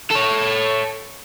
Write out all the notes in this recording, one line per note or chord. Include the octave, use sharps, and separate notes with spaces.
A4 C#5